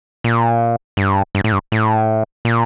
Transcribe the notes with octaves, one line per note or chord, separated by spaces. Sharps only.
A#2
G2
G2
A2
G2
A2
A#2